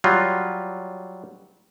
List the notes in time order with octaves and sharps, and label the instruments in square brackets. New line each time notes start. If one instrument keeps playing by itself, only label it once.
[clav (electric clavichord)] F#3 G3 F4